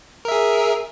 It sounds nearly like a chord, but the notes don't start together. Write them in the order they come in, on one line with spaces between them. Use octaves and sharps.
A#4 E5 G#4